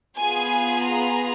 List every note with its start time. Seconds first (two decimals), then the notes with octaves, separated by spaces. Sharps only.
0.18 B3 F4 G#4 G#5
0.87 A#5